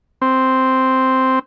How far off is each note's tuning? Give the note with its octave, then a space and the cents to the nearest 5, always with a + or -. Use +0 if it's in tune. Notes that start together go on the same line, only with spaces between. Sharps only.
C4 -5